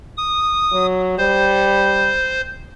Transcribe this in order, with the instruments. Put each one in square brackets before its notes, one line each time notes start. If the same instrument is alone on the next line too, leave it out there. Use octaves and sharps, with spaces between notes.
[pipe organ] D#6
[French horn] F#3
[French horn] G3 [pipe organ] C5